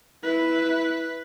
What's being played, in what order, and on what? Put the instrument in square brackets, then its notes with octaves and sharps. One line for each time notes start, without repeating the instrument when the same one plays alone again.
[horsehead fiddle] E4 [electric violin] B4